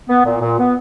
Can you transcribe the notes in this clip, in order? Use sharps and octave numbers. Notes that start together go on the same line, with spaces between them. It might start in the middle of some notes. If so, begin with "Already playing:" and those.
B3
A#2
A#2
B3